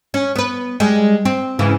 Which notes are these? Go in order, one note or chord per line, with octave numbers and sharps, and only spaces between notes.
C#4
B3 B4
G3 G#3
C4
G#2 C#3 E3